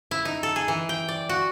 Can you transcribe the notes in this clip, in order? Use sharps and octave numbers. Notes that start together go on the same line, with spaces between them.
E4
D#4
A4
G#4
E3
G5
D5
F#4